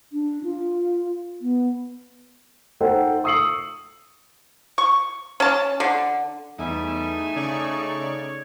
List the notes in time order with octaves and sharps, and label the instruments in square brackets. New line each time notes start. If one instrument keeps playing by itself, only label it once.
[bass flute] D4
F4
B3
[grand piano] D#4 A4 C5 F#5 G5
C#6 D#6 E6 C7 C#7 F#7
[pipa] C#6
C#4 A5
D3
[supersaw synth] E2 [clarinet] G3 [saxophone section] A3 D#4 [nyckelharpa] E5 G#5
[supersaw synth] C#3 D5 C#6 [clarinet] C#5